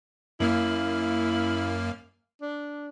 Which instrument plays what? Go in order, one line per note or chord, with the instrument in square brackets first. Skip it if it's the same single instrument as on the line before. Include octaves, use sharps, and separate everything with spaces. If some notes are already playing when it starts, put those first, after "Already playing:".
[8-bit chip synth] F#2 A#3 F6 [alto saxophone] E4
[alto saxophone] D4